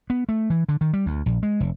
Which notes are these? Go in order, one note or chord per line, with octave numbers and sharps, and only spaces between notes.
B3
A3
E3
D3
D#3
G3
D2
A#1
G#3
F1